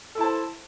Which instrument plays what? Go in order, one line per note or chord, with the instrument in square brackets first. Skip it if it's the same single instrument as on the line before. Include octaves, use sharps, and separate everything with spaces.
[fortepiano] A4
E4
A5
C5